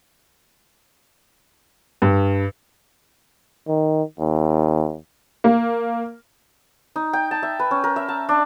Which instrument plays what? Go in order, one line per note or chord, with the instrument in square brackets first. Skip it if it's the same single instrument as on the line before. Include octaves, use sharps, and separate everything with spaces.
[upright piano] G2
[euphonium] D#3
D#2
[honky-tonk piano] A#3
[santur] D#4
G5
A5
E5
B4
C#4
A#4
E5
A5
D4